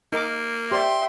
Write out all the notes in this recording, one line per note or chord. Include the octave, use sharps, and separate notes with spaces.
A#3 D#4 A#4 D6
G4 C5 D5 E5 G5 C6